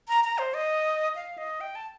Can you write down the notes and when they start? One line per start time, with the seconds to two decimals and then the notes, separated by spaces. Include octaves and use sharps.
0.09 A#5
0.24 A#5
0.38 C5
0.54 D#5
1.15 F5
1.38 D#5
1.61 G5
1.75 A5